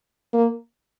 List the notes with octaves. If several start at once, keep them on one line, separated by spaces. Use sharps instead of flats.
A#3